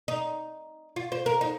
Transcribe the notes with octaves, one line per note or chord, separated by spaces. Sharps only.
D#4
F4
C5
A#4
D#4